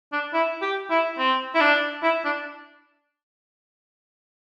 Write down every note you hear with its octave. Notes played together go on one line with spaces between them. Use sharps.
D4
E4
G4
E4
C4
E4
D4
E4
D4